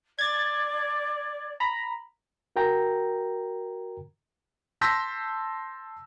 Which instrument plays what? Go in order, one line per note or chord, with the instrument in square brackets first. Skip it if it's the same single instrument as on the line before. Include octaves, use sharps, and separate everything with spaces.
[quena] D5 [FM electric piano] G#6 A6
[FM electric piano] A#5 B5
[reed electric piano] F#4 A#4 G5 A#5
[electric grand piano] A5 C6 E6 G6 A#6 B6